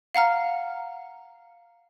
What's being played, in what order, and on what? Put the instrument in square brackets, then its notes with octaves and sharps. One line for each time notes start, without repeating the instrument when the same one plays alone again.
[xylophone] F5 F#5 A#5 F6